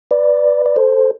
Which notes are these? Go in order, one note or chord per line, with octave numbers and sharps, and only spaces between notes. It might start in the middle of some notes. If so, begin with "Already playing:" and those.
B4 D5
D5
A4 C5